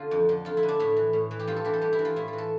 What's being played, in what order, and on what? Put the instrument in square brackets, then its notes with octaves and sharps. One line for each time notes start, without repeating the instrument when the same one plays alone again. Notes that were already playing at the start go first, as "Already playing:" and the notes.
Already playing: [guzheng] D3 F4
F2
D3
F2 F4
E4
D3
D4
A2 E4
E3
A2
E3
G4
G2 F4
A4
E3 G4
A4
G2 G4
E4
E3
F4
A2 E4
F4
E3
A4